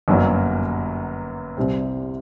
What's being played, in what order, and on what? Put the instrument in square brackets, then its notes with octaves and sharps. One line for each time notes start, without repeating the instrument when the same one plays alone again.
[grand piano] G1 F#2 F#3 A#3
C2 C3 G3 C4